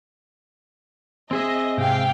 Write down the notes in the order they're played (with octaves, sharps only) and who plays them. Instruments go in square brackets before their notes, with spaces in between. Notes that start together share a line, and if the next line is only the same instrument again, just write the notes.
[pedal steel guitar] C4 G#4 E5 [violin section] D#5
[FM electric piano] G#2 C3 [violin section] G4 F5 G5